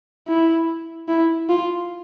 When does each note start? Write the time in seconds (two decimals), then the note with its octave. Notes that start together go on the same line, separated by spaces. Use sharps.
0.28 E4
1.08 E4
1.49 F4